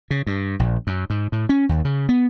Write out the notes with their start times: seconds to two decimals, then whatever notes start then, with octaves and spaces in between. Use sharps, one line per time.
0.11 C#3
0.27 G2
0.59 A#1
0.87 F#2
1.10 G#2
1.32 A2
1.49 C#4
1.69 D#2
1.85 C#3
2.09 B3